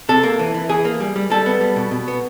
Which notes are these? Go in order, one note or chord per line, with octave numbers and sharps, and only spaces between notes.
C3 A4
A#3
E3
E3
E3 G#4
A#3
G3
G3
G3 A4
B3
G3
B2
B2
B3